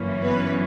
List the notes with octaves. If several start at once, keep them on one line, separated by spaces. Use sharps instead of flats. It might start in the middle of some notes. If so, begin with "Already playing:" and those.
Already playing: G1 F#2 E3 A#3 C#4
B3 B4